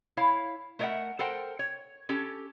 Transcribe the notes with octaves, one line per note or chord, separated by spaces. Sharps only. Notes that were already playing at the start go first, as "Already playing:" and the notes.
E4 C#5 F5
A3 A#4 C#5 D#5 E5 F#5
A4 A#4 C5 F#5 G5
C#5
C#4 G4 A4